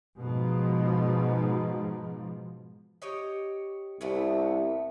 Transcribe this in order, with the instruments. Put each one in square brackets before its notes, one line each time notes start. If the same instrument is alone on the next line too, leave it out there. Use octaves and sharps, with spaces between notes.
[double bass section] G#2 B2 F3
[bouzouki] G4 C#5 D#5
[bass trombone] C2 [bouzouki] A2 A3 B3